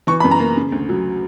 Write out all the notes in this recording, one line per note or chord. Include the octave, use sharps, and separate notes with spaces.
E3 C#6
B5
F#2
A#5
A#3
C#3
D2
F#3